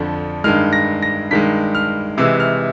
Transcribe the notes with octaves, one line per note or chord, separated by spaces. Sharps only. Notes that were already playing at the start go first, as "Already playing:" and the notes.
Already playing: F2 D3 F3
G2 D#3 G#3 F6
A#6
A#6
G2 D#3 G#3 B6
F6
C3 E3 G#3 E6
F6